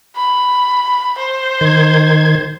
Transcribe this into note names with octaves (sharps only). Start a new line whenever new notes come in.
B5
C5
D#3 G#6